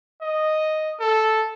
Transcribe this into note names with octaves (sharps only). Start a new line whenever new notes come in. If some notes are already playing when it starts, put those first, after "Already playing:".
D#5
A4